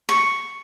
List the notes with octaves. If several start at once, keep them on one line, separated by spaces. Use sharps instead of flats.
C#6